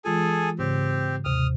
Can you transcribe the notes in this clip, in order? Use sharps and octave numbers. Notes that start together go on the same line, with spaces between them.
E3 G#3 F4 G#4 A4 G#5
G#2 C#3 C4 G4
D#2 C3 D#6 F6